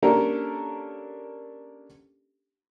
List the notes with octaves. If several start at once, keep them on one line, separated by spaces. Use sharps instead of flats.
A#3 C#4 D4 G4 A4 A#4